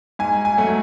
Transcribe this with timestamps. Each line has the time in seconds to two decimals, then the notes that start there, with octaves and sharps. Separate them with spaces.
0.19 G#2 G#5
0.45 G#5
0.57 F#3 A3